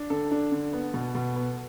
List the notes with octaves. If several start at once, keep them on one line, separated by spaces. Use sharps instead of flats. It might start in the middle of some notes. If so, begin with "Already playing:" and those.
Already playing: D4
D3 A4
D4
D3
B3
B2
B2
B3